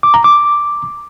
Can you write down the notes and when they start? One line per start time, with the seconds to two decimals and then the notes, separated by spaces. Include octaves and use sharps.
0.03 D6
0.14 A#5
0.24 D6